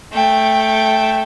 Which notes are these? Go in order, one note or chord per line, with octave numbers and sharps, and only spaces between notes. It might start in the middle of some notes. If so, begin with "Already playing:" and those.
A3 G5